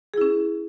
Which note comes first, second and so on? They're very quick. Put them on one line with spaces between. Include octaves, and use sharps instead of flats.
G#4 E4 C#4